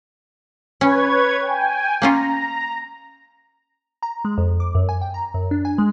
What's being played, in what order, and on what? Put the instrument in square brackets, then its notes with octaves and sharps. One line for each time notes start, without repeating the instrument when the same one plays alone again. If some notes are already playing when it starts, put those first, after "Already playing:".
[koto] C#4 [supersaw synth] B4 C#5 G#6
[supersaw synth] G5 G#5
[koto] A#3 C#4 F4 [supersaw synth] A#5
[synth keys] A#5
G#3
F2
D6
F#2
G#5
G5
A#5
F#2
D4
G#5
G#3